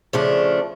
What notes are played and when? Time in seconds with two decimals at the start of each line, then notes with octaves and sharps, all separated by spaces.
0.13 C#3 F3 A3 D4